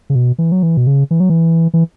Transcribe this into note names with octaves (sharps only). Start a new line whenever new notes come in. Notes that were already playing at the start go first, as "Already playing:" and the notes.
C#3
B2
E3
F#3
E3
B2
C#3
E3
F#3
E3
E3